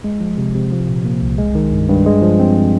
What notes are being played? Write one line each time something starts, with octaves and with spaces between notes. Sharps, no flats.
G#3
F3
C3
C3
F3
A#2
A#3
C2
G#3
D#3
G2
G2
G#3
F3
C4